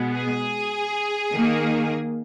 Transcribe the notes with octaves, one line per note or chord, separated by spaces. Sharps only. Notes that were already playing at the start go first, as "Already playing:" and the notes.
Already playing: B2 G#3 B3
G#4
D#3 A#3